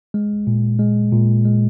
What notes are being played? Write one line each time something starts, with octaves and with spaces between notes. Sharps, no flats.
G#3
A#2
G#3
A#2
G#3